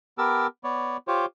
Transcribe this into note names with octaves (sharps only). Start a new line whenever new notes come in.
B3 G4 A#4 A5 E6
B3 C#5 D5
F4 G4 C5 C#5